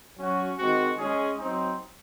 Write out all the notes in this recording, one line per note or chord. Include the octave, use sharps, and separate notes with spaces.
F#3 C#4 F#4
D#3 G#3 C4 F#4
G#3 C#4 G#4
F#3 C4 D#4